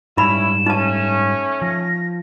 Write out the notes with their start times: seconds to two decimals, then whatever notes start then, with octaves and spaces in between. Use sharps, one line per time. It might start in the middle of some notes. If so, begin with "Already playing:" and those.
0.17 G#2 G3 C#4 D#4 E4 B5 E7
0.67 A3 C#4 D#4 A5
1.62 F3 A#6